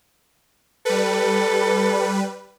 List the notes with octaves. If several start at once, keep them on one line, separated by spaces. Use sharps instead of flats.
G3 A4 B4